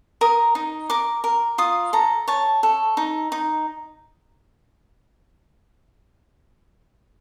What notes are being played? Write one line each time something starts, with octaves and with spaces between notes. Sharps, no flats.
A#4 D#6
D#4
A#4 D6
A#4
F4 D#6
A4 A#5
C#5 A5
A4
D#4
D#4